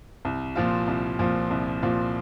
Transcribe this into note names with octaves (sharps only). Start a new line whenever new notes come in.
C2
A#2 F3 C4 F4
C2
A#2 F3 C4 F4
C2
A#2 F3 C4 F4